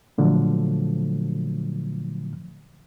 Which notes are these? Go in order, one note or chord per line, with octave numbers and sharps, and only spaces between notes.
A#2 D3 F3 F#3 A3